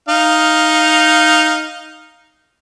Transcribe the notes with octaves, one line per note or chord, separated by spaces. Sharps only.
D#4 F5